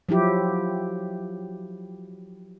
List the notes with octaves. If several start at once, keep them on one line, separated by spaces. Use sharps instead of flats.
F3 F#3 E4 G4